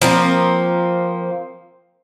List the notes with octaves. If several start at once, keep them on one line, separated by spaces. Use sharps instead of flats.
F3 A#3 C4